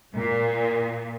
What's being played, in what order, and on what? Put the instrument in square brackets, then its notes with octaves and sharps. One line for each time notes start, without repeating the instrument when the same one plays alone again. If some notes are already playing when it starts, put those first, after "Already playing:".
[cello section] A#2